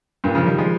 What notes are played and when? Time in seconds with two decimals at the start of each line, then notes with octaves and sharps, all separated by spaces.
0.24 G2 A#2
0.35 C#3 F3
0.46 D#3 G3
0.58 F3 G#3